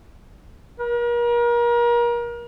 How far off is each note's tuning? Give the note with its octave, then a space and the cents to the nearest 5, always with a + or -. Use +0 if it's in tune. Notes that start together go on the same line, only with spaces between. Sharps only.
A#4 +35